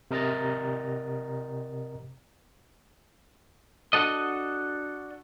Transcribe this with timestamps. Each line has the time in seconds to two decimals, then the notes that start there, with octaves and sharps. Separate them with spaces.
0.11 C3 A#4 D#5 A#5 A6
3.93 D4 F#4 A4 D#5